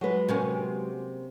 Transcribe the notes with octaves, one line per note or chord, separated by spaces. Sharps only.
F#3 G#3 B4
C3 A#3 C#4